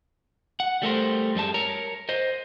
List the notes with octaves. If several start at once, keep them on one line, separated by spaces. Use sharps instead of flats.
F#5
G3 A3 A#4 C5
F#2 G3 G#3 A5
A#4 C#5 A#5
C5 D#5